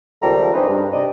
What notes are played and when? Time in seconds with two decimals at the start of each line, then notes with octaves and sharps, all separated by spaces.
0.21 C#2 D#3 F3 G3 A3 A#5
0.53 C4 D4 D#4 G#4 B4 C5
0.67 G2
0.92 C3 D5 D#5